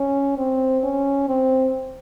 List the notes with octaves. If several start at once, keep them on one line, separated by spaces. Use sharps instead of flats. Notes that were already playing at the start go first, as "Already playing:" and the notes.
Already playing: C#4
C4
C#4
C4